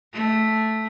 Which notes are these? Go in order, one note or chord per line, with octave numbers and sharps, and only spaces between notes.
A3